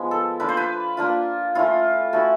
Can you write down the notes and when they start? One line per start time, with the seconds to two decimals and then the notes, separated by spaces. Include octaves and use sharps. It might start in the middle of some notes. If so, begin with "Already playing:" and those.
Already playing: F3 G#3 B3
0.11 A4
0.40 A#3 D4 F4 B4
0.49 C5
0.57 B4
0.97 A#3 D4 F4
1.55 A3 C#4 E4 F4
2.13 A3 C#4 E4 F#4